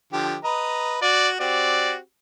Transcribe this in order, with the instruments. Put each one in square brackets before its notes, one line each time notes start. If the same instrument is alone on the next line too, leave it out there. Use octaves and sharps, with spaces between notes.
[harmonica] D3 F3 G4
B4 D#5 A#5
[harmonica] F#4 [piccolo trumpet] D5
[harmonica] C4 F#4 G4 [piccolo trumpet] D5